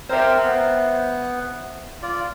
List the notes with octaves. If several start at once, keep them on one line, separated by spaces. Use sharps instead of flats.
C4 A#4 C5 E5
B3
F4 D5